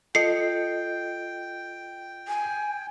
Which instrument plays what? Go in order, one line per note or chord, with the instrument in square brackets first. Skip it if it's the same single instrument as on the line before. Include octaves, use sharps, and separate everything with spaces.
[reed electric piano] F4 A4 D#5 [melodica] G5 [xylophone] C7 C#7
[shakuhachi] G#5